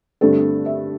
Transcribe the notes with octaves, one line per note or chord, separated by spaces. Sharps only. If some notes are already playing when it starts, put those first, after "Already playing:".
G2 D3 A3 C4 A4
E5